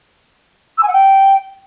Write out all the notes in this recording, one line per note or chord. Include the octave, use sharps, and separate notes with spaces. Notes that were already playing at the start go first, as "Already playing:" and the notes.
E6
G#5
F#5
G5